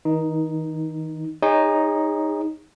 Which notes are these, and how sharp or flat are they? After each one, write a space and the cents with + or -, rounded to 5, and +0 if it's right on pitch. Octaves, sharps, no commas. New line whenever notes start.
D#3 +40 D#4 +0
D#4 +0 G#4 -35 C#5 +0